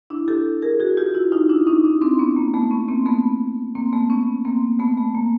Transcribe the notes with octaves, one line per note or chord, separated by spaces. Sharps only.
D4 E4
G4 A4
G#4 A#4
F#4 G#4
F4 G4
E4 F#4
D#4 F4
D4 E4
C#4 D#4
D4 E4
C4 D4
B3 C#4
A#3
A3 B3
B3 C#4
A#3 C4
A3 B3
A#3 C4
A3 B3
B3 C#4
A#3 C4
A3 B3
A3
A#3